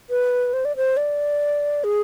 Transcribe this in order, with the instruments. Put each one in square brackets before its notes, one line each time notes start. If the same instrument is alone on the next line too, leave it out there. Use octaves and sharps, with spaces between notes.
[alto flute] B4
C5
D5
C5
D5
G#4